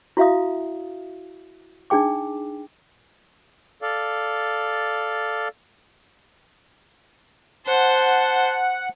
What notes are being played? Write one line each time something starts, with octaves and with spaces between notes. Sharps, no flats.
E4 F#4 E5 F5 D#6
D4 D#4 G#4 G5 D6
A4 D5 F5
C5 F#5 A5